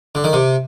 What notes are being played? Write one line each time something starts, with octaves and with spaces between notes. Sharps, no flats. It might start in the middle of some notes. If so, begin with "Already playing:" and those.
D3
D#3
C3